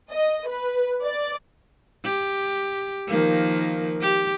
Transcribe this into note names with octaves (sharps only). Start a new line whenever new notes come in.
D#5
B4
D5
G4
D#3 F3 A#3
G4